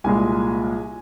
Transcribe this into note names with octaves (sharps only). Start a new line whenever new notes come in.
C2 A#2 G#3 G#5